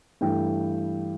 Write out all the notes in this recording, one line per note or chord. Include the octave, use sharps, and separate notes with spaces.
G2 E3 A3 G5